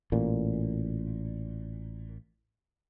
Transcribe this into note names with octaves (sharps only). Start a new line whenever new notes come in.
A1 A#2